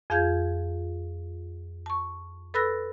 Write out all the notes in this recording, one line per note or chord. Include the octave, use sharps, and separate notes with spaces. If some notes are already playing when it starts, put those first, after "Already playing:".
F2 F4 G#4 F5 G6 G#6
A5 C#6
A4 B4 B5 E6 F#6 A#6